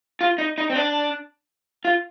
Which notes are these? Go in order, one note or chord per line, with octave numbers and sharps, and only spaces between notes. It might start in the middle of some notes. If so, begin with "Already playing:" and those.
F4
D#4
D#4
C4
D4
F4